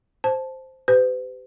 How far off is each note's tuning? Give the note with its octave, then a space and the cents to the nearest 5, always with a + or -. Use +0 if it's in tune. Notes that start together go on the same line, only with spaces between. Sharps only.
C5 +0 A5 -10
G4 -5 B4 +45